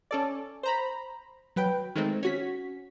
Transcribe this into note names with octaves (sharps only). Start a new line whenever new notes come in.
C#4 A4 D5
C5 A#5 B5
F#3 B4 G5
D#3 G#3 A3 C4
C#4 F#4 B6